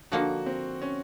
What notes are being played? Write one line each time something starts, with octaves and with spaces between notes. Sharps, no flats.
D3 F3 A#3 D#4 F#4
C4
C#4